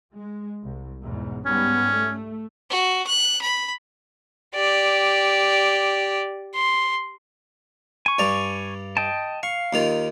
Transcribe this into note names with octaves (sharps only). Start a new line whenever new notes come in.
G#3
C2
E2 G#2 B2
G#2 G3 B3 C#4
A3
F#4
F#6
B5
G4 D5
C6
G#5 C#6
G2 D5 A#5
D#5 G5 A5
F5 C#6
D#2 D#3 F4